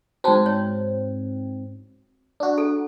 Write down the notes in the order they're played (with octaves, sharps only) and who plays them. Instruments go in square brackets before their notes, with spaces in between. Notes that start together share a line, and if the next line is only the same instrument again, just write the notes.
[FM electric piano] G#2 C4 [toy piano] F#4 C5 A5
[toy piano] C#5
[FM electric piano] D4 F#4
[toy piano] A4